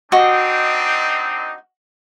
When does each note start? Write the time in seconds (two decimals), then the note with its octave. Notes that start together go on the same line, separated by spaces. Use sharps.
0.12 C4 D4 D#4 F#4 D#5